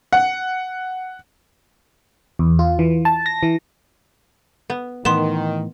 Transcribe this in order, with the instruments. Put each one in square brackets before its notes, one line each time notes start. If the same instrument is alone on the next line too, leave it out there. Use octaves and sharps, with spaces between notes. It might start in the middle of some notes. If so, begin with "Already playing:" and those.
[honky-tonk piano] F#5
[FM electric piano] E2
F4
E3
A5
A#6
E3
[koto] B3
[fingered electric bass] A2 E3 [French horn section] D#3 [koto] B3 [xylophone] C6 E7